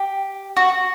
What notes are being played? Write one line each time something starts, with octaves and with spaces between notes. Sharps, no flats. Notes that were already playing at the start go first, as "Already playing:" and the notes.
Already playing: G4
F#4